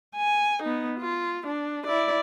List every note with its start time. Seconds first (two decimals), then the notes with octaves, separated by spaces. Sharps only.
0.16 G#5
0.63 B3 D#4
0.99 F4
1.47 D4
1.87 E4 D5